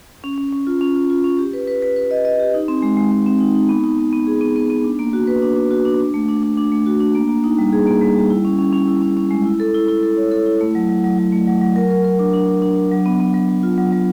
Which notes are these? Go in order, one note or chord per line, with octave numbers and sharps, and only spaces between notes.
C#4
C#4
C#4
F4
C#4
F4
F4
C#4
G4
B4
B4
B4
B4
D#5
D#5
G4
D#4
C4
G#3
G#3
G#3
C4
D#4
D#4
B3
D#4
B3
B3
G#4
B3
B3
B3
D4
A#3
F#4
B4
D4
D4
F#4
D4
D4
A3
D4
D4
D4
A3
F#4
D4
A#3
A#3
D#4
G3
G#4
A#3
G3
G3
E4
C#4
C#4
C#4
E4
C#4
C#4
G#3
E4
A4
E4
E4
A4
C#5
A4
E4
A3
F#3
F#3
F#3
F#3
A3
F#3
F#3
A#4
A#4
A#4
D4
D4
D4
D4
D4
F#3
B3
B3
F#3
F#3
F4
F#3
F#3